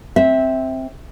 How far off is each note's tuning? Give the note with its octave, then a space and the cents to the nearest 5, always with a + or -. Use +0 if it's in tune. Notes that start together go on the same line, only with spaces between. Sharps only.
C4 +5 E5 -15